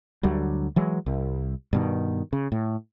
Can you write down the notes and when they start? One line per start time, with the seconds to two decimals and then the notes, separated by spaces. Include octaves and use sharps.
0.23 D2 D3 F#3 G3
0.76 E3 F#3 G#3
1.06 C2
1.73 G2 B2 D#3
2.33 C#3
2.52 A2